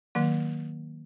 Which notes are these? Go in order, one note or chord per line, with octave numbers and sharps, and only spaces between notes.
D#3 F#3 A#3